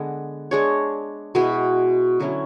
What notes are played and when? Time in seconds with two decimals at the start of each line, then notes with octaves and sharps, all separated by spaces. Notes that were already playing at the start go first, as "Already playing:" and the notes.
Already playing: D3 G#3 B3
0.51 G#3 D4 G#4 C#5
1.35 B2 G#3 B3 E4
2.20 D3 F#3 C#4 E4